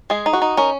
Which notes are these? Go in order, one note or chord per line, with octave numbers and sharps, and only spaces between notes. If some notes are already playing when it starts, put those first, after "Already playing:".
G#3 G#4
D#4
F#4
D#4
C#4 A#4